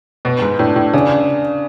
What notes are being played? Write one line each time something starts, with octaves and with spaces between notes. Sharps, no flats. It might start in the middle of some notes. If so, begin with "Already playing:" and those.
B2 B4
G#2
A2 D4
A2
C#3 D5